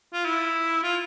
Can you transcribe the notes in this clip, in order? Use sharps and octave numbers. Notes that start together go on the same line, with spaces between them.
F4
E4
F4